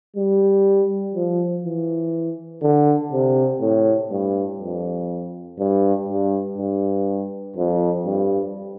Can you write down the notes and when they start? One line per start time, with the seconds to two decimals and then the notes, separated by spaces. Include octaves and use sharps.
0.16 G3
1.14 F3
1.64 E3
2.62 D3
3.12 C3
3.61 A2
4.11 G2
4.60 F2
5.59 G2
6.08 G2
6.58 G2
7.56 F2
8.06 G2